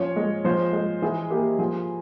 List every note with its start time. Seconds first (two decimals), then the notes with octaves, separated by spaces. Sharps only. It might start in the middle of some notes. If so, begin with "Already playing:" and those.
Already playing: F3 C#4 C#5
0.16 G#3
0.45 F3 C5
0.73 G#3
1.02 E3 G#4
1.30 A#3 G4
1.59 F3 G#4